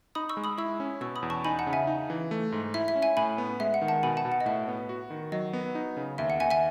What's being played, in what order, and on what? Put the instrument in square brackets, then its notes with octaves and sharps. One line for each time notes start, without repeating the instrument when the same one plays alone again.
[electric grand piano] D#4 [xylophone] B5 D#6
[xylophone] C#6 E6
[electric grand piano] G#3
[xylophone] B5 D#6
[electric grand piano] E4 [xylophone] C#6 E6
[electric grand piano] C#4
[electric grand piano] B2 [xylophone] C#6 E6
[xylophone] B5 D#6
[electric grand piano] E2
[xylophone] A5 C#6
[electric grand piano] D#4 [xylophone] G#5 B5
[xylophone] F#5 A5
[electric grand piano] C#3
[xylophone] E5 G#5
[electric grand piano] D#4
E3
A3
G#2
[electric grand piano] E4 [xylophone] E5
[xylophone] E5
[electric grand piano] C#4
[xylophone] E5 G#5
[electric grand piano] A2 [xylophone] G#5 B5
[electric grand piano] B3
[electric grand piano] G#3 [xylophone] E5
[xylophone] F#5
[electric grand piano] D#3
[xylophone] F#5 A5
[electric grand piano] B2 [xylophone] G#5 B5
[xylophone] F#5 A5
[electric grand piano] B2
[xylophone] F#5
D#5
[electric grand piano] A2 [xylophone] E5
[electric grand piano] B3
F#4
D#3
[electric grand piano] F#3 [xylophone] D#5
[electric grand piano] B3
D#4
C#3
[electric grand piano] D#2 [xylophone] E5
[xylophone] F#5
[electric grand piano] D#2 [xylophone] E5 G#5
[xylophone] E5 G#5